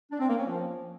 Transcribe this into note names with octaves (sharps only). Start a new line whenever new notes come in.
D4
C4
A#3
C#4
F3